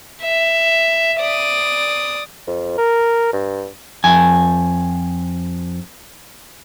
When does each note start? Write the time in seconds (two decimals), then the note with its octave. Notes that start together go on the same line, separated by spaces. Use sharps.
0.22 E5
1.20 D5 D#6
2.47 F2
2.78 A#4
3.33 G2
4.04 F2 G#5